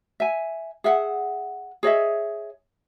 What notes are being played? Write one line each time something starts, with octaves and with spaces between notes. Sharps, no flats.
E5 G#5
G#4 E5 F#5
G#4 C#5 D#5 E5